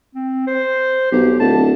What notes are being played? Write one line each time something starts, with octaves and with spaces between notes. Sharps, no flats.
C4
C5
B1 G4
D1 A5